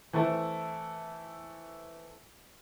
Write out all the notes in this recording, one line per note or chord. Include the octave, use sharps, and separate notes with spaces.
E3 A3 C4 E4